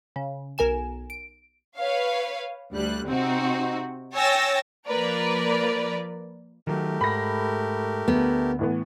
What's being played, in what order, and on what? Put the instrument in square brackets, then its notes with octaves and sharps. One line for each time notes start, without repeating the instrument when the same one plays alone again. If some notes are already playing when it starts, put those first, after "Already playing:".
[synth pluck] C#3
B1 A#4 G#5 E7
D7
[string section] B4 C#5 F5
D2 G3 F#6
C3 C4 D#4 F#4
C#5 G5 G#5 E6 A6 A#6
F3 A#3 A#4 B4 D5
[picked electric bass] D#3 E3 F#3 [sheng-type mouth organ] A3 G4 A#4
[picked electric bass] G#2 [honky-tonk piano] B5 A#6
[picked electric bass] D2 [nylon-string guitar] B3
[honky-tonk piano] A2 E3 B3